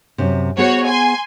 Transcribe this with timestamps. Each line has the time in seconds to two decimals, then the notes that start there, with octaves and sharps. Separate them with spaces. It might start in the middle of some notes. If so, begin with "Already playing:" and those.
0.18 F#2 C3
0.58 B3 F#4 G#4 C5 C#5
0.88 G#5 C6